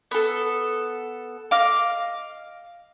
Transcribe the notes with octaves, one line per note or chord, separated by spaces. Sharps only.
B3 A4
D#5 F5 D6